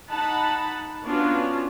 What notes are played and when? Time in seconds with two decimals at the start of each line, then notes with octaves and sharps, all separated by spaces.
0.10 D#4 F#5 A5 B5
1.04 B3 C#4 D4 F4 F#4